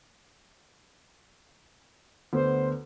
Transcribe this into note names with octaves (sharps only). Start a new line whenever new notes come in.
D2 B3 C5